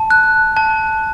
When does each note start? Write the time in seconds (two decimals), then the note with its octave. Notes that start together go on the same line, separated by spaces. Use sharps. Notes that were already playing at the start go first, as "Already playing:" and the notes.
Already playing: A5
0.10 F#6
0.57 A5